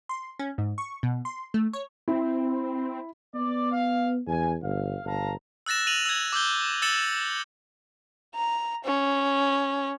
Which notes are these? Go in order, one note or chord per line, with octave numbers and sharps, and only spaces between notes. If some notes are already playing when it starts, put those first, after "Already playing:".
C6
C#4
G#2
C#6
B2
C6
A3
C#5
C4 E4
B3 D5
F5
E2 G#5
G1 F5
G1 F5 A5 A#5
E6 F#6 A6 A#6 E7
D#7 F7 F#7
E6 G#6
D6 E6 G6 G7
E6 A6 C#7 E7 G7
A#5
C#4